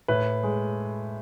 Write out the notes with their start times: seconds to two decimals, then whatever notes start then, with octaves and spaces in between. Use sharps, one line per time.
0.08 A2 B4
0.43 G#3